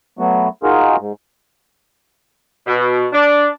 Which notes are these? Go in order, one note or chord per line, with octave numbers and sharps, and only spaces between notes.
F#3 A3 B3 F#4
D#4 F4 F#4 G#4 A#4
G#2
B2
D4